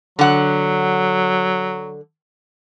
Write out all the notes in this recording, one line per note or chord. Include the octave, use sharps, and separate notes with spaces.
D3 F#3 F#5